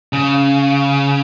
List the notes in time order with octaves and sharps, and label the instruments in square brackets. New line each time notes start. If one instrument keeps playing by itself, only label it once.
[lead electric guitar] C#3